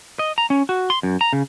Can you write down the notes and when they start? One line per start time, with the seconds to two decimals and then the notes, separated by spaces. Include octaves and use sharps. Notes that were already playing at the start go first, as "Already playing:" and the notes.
0.19 D#5
0.38 A#5
0.50 C#4
0.69 F#4
0.90 C6
1.03 F#2
1.21 A#5
1.33 C#3